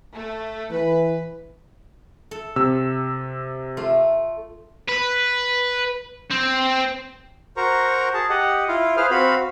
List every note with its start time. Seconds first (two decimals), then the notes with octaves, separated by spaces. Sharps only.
0.12 A3
0.71 E3 B4
2.31 A4
2.56 C3 E6
3.77 A3 F4
4.88 B4
6.31 C4
7.57 F#4 A#4 C5 A#5 C#6
8.14 G#4 A5
8.29 G4 D#5 F#5
8.68 E4 F4 F5
8.97 G#4 B4 C5 F5 F6
9.10 C4 F#4 F5 B5